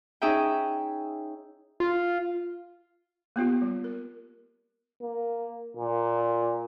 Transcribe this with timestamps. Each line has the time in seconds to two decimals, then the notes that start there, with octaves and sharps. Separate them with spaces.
0.22 C#4 D#4 G#4 E5 G5
1.80 F4
3.36 A#3 B3 F4 G4
3.62 G3
3.84 A#4
5.02 A#3
5.77 A#2